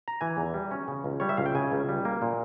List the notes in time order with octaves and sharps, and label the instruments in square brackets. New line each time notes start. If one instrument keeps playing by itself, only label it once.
[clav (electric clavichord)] A#5
E3 G#5
E2
G3
C#4
C#3
C#2
G3 C#5
E5
C#2 F5
G5
C#3 G#5
C#2
G3
A#3
A#2